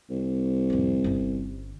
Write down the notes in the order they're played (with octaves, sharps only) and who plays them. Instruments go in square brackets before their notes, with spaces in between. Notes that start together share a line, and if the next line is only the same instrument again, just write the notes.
[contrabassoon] C2
[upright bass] A1 F2
G1 C#4